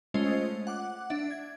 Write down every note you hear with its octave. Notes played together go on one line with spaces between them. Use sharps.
G#3 A3 C#4 F4 C5 D#5
F#5 D6 F#6
D4 E5
G#6